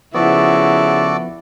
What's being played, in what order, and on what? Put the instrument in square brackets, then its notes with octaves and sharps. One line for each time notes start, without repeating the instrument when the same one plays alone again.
[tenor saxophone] C#3 [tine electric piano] F3 B3 [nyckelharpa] E4 [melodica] F#4 A4 D5